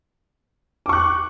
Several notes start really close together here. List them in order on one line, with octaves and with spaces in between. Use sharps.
D6 C#6 F#6